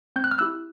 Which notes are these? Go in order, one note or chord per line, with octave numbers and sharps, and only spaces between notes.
C4 G6
F#6
F6
E4 G4 E6 F#6